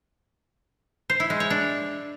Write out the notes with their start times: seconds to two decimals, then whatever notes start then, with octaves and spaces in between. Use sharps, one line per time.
1.10 C5
1.20 E4
1.30 G#3
1.40 C#5
1.50 D4